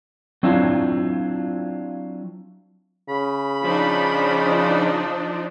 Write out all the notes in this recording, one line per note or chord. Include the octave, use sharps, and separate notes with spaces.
F#3 C4 D4 E4 F4
C#3 B5
F3 D4 D#4